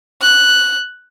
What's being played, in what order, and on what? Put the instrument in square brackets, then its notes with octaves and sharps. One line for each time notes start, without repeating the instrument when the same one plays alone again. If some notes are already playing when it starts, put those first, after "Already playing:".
[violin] F#6